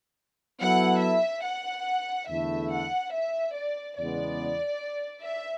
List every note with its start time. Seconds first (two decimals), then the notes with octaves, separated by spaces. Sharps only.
0.61 F#3 B3 E4 A4 F#5
1.03 E5
1.45 F#5
2.29 E2 D3 A3 E4 A4 E5
2.72 F#5
3.14 E5
3.56 D5
3.98 E2 C#3 G#3 B3 D5
5.25 E5